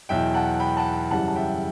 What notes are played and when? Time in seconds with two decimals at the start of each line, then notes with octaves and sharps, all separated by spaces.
0.09 E2 B2 F#3 E5 G5
0.34 F#5 A5
0.60 G5 B5
0.77 F#5 A5
1.11 F#2 C#3 E3 G3 F#5 A5
1.28 A5
1.35 E5 G5